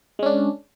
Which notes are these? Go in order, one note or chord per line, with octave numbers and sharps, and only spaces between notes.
G#3 C#4 D4